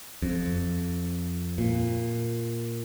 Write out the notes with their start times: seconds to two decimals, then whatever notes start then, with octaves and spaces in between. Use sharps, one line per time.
0.22 F2
1.58 A#2